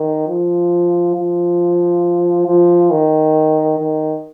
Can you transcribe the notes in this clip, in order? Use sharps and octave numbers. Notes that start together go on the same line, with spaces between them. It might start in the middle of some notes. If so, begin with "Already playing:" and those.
Already playing: D#3
F3
F3
F3
D#3
D#3